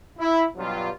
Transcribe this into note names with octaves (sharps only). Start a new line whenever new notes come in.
E4
G2 B2 F#3 F4